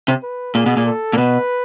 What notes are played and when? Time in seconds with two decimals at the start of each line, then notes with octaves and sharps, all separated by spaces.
0.08 C3
0.23 B4
0.55 A#2 G#4
0.66 B2
0.77 A#2
0.87 A4
1.13 A#2
1.17 B2 B4